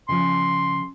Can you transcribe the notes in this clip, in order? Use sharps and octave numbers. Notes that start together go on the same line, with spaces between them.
C#3 F3 C6